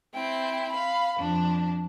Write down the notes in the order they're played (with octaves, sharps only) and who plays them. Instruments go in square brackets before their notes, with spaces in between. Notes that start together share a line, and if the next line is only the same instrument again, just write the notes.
[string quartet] C4 E4 G5
F5 B5
F2 D4